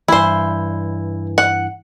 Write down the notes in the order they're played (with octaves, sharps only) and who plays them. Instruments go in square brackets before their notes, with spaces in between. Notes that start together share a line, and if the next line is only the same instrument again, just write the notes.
[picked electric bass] G2 E3 [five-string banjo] E4 C5
[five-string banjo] F#5